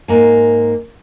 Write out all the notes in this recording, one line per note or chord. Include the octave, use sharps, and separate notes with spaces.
G#2 A#3 G#5